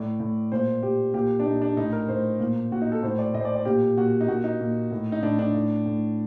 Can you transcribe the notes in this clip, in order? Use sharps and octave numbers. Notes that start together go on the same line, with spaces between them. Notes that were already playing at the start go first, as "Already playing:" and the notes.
Already playing: A2 D5
A2
A#2 C5
A#2 G4
A#2 G4
D4
A#2 D#4
D4
A2 D#4
A#4
A2 C5
A#2
A#2 F#4
D#4
A4
A2 C5
D5
A2 D#5
C5
D5
D5
A#2 G4
A#2 F#4
D#4
A#2 F#4
D#4
A#2
A2
D#4
A2 D4
D4
A2
A2